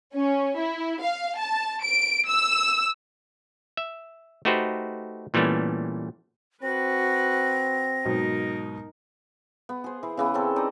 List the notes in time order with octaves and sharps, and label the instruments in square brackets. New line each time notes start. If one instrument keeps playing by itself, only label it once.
[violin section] C#4
E4
F5
A5
D7
E6
[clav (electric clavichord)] E5
A3 D#4 F#4 G4 B4 C5
A#2 E3 G3 A3 B3 C#4
[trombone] C4 [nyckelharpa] F#4 B4 [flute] A#6
[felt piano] G#2 B2 F#3 [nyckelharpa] D#4 A#4
[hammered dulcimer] B3
G#4 C5
E3
C#3 E3 B3
C4 C#4 A4
D#4 A4 D5 D#5